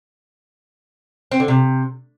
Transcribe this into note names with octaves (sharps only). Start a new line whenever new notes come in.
C4
D3
C3